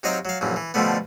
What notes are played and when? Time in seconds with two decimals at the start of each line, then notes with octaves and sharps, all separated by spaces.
0.03 C3 F#3 D#4 D#5 F5 G5
0.25 F#3 F5
0.41 A#1 F#2 E3
0.56 E3
0.74 B2 D3 F3 G3 A3 B3